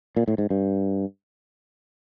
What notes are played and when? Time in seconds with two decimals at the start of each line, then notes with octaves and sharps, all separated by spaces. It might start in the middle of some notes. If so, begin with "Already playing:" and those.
0.17 A#2
0.28 A2
0.38 G#2
0.50 G2